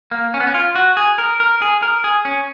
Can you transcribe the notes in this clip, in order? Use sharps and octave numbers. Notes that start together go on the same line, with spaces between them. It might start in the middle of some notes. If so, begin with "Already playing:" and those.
A#3
C#4
B3
C#4
F4
F#4
G#4
A#4
A#4
G#4
A#4
G#4
C#4